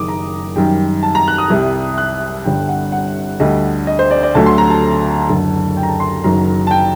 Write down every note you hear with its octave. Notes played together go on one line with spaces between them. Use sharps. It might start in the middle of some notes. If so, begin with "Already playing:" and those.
Already playing: F#1 F#2 D#3 D6 D#6
A#5
F#2 D#3 G3 G5
A5
A#5
F#6
D#6
C2 C3 G3
F#6
G1 G2 D3 G3 G5
F#5
F#5
D2 D3 G3 D#5
D#5
C5
D5
D5
D2 D3 F#3 A3 A5
C6
A#5
A5
F#1 F#2 D3
G5
A#5
A5
C6
F#1 F#2 D#3 F#3 A#5
A5
G5